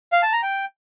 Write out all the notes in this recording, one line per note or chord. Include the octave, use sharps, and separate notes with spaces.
F5
A5
A#5
G5